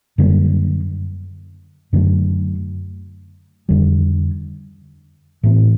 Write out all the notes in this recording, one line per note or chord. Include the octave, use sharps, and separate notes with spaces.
F#2 D3 G3 A#3
F#2 D3 F#3 A3
F2 D3 G3
A2 E3 A3 C4